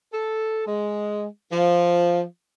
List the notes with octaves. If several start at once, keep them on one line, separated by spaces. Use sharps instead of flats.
A4
G#3
F3